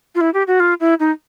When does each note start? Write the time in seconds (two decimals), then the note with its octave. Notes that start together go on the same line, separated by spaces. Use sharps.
0.15 F4
0.21 E4
0.34 G4
0.47 F#4
0.60 F4
0.80 E4
1.00 D#4